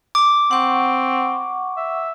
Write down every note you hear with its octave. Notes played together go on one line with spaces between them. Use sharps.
D6
C4 F#5 C#6
E5